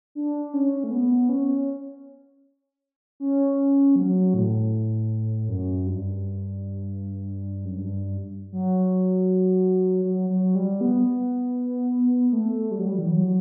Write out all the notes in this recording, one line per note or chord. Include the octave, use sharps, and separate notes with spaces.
D4
C#4
A3
B3
C#4
C#4
F#3
A2
F#2
G2
F#2
G2
F#3
F#3
F#3
G3
B3
A3
G3
F#3
G3
E3
F#3